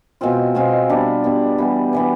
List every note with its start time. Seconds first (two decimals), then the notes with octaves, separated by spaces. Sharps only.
0.21 B2 G#3 C4 F4
0.55 B2 G#3 C4 F4
0.89 G3 B3 D4
1.24 G3 B3 D4
1.58 E3 G3 B3
1.93 E3 G3 B3